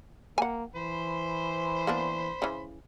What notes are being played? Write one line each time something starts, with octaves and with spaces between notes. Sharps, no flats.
A#3 F#5 G#5
E3 C5 B5 C6
A#3 B3 D4
C#3 E3